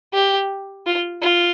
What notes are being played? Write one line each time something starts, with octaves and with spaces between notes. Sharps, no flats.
G4
F4
F4